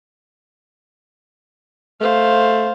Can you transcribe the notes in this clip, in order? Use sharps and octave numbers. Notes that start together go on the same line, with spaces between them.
A3 C5 F5